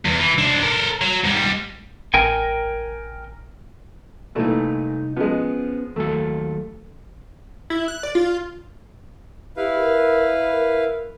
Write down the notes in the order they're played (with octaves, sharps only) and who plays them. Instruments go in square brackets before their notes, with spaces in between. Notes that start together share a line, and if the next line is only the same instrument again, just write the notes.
[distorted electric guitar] E2
E3
D4 C5
A4 A#4
F#3
G#2 G3
[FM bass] A1 [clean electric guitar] A#4 G5 G#5
[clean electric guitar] C2 D#4 [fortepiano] A#2 E3 A3
[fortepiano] F3 G#3 [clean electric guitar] B3 C#4
[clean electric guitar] D#2 F#3 A4 [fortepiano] A3
[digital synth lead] E4
F#6
D5
F4
[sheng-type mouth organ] E4 B4 F5 [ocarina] G4
[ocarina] A#4
A#4